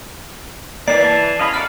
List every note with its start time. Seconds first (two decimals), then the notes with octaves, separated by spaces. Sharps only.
0.88 E3 A#3 D5 C7
1.04 A5
1.39 E2 C#4 D#5 F5 B5
1.54 A3 A#3 F#4 D5 F6